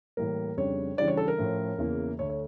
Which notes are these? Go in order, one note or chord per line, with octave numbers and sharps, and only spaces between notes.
A2 E3 G3 A#3 A#4
F2 C#3 G3 D4 C#5
C#3 E3 G3 D4 D5
C#5
A4
A#4
A2 F3 A3 C#4
E2 C#3 E3 A#3
D2 D3 A3 D4 C#5
C#5